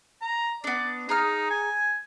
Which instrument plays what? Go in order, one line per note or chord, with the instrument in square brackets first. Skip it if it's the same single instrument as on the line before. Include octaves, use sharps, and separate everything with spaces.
[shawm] A#5
[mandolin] B3 D4 [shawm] D5
[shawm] D#4 [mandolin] G#4 A#5 F6
[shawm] G#5